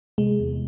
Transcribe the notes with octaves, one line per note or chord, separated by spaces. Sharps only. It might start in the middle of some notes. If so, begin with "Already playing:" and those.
C3 G#3
E2